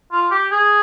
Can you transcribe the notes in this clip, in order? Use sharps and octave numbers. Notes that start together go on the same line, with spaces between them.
F4
G4
G#4